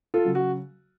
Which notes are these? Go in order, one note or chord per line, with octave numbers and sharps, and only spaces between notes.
F4 A4
C#3 F#3
F#4